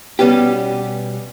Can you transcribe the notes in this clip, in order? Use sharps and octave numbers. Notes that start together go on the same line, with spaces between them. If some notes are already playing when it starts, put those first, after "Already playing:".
B2 G3 B3 C#4 G4